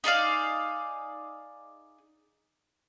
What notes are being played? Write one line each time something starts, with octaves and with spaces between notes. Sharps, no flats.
D#4 G#4 D5 F5